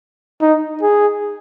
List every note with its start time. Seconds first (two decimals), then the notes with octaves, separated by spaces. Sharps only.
0.42 D#4
0.82 G#4